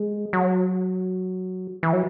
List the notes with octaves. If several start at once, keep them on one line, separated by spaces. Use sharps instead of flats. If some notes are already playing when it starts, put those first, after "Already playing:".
Already playing: G#3
F#3
E3
F#3